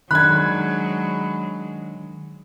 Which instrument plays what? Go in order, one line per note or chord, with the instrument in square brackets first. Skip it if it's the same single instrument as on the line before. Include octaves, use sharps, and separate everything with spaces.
[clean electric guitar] D#3 D4 [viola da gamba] F#3 G#3 [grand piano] B5 G#6 [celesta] F#6